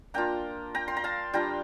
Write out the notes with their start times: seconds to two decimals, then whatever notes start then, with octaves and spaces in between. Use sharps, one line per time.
0.14 A#3 D4 F4 G5 A#5
0.75 G5 A#5
0.88 C6
0.97 A#5
1.04 F5 A5
1.33 G3 D4 F4 G5 A#5